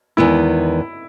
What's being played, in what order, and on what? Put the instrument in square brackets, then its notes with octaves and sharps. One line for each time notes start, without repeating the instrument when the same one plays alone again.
[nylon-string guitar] E2 D#3 G#3 B3 [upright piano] E4